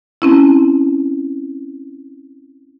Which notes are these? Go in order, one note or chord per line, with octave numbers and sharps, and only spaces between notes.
C4 C#4 E4